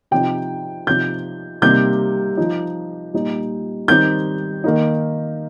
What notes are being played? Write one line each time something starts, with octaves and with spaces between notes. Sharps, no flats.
C3 F3 D#4 G5
C3 F3 D#4 G6
C3 G3 A#3 D#4 G6
F3 D#4
A#2 G3 D#4
D#3 G3 C4 D#4 G6
D#3 A#3 D#4